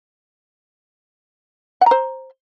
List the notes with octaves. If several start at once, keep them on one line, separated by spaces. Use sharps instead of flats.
C5 F#5 A#5